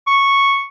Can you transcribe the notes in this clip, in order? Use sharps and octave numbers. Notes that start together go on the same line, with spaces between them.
C#6